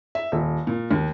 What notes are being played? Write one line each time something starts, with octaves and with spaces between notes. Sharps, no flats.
E5
D#1
A#2
D#2